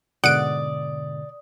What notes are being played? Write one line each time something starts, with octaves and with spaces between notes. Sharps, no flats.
G#2 B2 D3 D5 F#5 D#6 D7